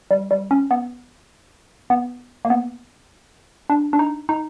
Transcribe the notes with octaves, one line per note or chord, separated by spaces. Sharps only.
G3
G3
C#4
B3
B3
A#3
B3
D4
D4
D#4
D#4